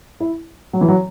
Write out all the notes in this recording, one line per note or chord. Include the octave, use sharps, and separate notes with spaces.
E4
F#3
E3
F#3